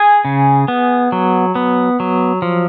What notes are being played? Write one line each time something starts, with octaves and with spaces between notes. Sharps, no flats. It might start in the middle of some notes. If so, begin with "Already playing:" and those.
Already playing: G#4 G#5
C#3
B3
F#3
B3
F#3
F3